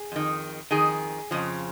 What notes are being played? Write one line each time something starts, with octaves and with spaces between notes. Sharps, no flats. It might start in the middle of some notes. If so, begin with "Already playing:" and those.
Already playing: G#4
F2 D#3
F2 D#3 G#4
F2 C#3 F3